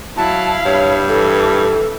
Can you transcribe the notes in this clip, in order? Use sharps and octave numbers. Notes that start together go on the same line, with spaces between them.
F#3 E4 F5 A5
G2 C#5
E3 A4